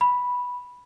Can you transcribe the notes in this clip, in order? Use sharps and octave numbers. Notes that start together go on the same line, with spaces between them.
B5